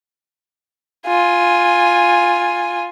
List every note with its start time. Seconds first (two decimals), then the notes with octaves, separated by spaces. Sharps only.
1.07 F4 G#5